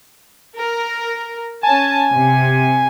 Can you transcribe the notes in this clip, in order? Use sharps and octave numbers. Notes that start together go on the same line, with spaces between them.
A#4
C#4 G#5 A5
C3